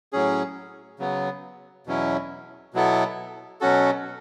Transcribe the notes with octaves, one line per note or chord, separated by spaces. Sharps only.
A2 F#3 C#4 G#4
C#3 F#3 B3
E2 B2 F#3 C#4 E4
B2 F#3 B3 E4 A4
B2 F#3 C#4 F#4 A4